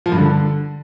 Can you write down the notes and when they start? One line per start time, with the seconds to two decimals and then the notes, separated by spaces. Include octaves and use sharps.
0.06 F3
0.12 G2
0.18 D3